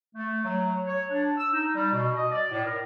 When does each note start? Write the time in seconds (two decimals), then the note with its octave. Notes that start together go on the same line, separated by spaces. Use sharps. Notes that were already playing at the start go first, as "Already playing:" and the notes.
0.15 A3
0.45 F#3
0.86 C#5
1.10 D4
1.37 E6
1.53 D#4
1.75 G3
1.93 B2
2.16 D#5
2.31 D5
2.51 A2
2.65 A#4